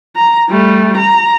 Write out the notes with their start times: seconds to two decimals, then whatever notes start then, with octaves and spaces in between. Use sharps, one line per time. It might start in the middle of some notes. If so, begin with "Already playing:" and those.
0.16 A#5
0.49 G3 A3
0.97 A#5